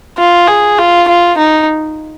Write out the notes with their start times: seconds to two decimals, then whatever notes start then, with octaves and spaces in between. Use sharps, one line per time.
0.17 F4
0.48 G#4
0.78 F4
1.08 F4
1.37 D#4